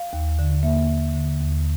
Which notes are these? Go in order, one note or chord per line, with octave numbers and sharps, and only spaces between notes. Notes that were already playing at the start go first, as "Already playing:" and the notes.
Already playing: F5
D#2
D3
A#3 E5
A#3
D3
D#2